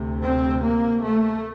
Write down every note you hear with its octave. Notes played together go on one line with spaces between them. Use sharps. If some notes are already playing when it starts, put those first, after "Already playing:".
Already playing: D2 C3
C4
A#3
A3